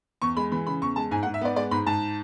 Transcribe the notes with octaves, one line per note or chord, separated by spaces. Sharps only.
E2 C#6
G#3 B5
E3 B5
C#3 B5
E2 C#6
G#3 A5
G#2 G#5
F#5
G#2
E5
B3 D5
G#3 D5
G#2 B5
G#2 A5